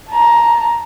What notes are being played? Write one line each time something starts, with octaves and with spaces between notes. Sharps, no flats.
A5 A#5